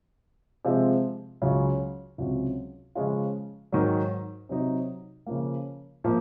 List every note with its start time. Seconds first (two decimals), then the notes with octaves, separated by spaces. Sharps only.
0.65 C3 F3 G#3 C4 F4
1.42 C#2 C#3 F#3
2.18 C#2 C3 F#3 C#4 F#4
2.95 C#3 F3 G#3 C#4 F4
3.72 G#2 D#3 F#3
4.49 C3 F#3 C4 D#4
5.26 C#3 F3 A#3
6.04 A#2 F3 A#3